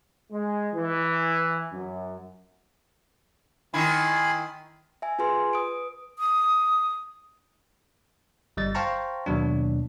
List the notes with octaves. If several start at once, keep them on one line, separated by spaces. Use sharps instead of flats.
G#3
E3
F#2
D#3 E4 G#5 B5 C6
E5 G#5
F4 G#4 B4 G#5 C6
B4 D#6 D7
D#6
G1 G3 D#5 A6
C5 F5 G5 A5 A#5 C#6
D#2 B2 F#3 D4